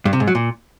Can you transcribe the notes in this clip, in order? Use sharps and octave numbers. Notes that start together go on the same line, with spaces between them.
G2
C3
G#2
F#3
A#2